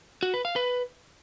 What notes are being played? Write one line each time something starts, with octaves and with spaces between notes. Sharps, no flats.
F#4
B4
F5
B4